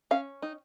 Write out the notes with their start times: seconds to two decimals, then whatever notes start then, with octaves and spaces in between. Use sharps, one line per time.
0.11 C#4 F5
0.42 D#4